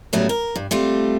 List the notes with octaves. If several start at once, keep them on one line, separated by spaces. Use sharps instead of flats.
A2 C#3 F#3 G3 A3 B3
A#4
G2
G3 A3 C4 F4